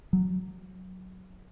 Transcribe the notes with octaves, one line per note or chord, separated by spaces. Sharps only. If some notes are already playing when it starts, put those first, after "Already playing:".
F#3